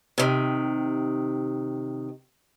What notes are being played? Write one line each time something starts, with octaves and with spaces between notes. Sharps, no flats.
C3 D#3